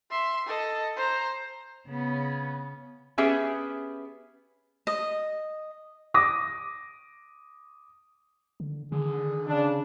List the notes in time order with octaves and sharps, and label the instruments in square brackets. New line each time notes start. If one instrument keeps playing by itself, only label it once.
[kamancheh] E5 C6
A4 D#5
C5 A#5
[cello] C#3 B3
[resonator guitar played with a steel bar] B3 C#4 G4 G#4 E5
[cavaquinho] D#5
[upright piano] D6 D#6 A#6
[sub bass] D3
[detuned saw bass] D3 [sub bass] D#3 [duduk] G#4
[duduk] C#3 [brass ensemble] D4